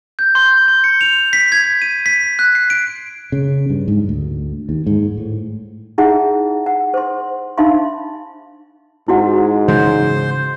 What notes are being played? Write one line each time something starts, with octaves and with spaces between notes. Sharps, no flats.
G6
C6
C6
C#7
F7
B6
G#6
D#7
B6
F#6
C7
D7
C#3
G2
G#2
D2
D#2
G#2
A2
D#4 E4 G#4 E5 F#5
F#5
C5 C6
D4 D#4 E5 F5 B5 C6
G#2 E4 F#4 F#5
C#3 E3 G#3 C5